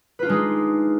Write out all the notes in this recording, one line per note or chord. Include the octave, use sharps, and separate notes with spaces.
G#3 D4 D#4 F4 B4